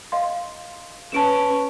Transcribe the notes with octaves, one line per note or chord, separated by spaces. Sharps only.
D#5 F5 C6
C#4 B4 A5 D7 E7